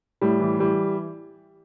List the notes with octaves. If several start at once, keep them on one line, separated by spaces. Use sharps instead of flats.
A2 G3
E3
E3 G3